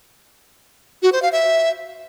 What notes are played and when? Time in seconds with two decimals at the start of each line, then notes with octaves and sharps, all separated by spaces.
1.02 F#4
1.12 C5
1.22 F5
1.32 E5